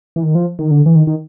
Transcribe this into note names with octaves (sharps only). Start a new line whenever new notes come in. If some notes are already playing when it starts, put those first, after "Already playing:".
E3
D#3
F3
D#3
D3
E3
D#3
D#3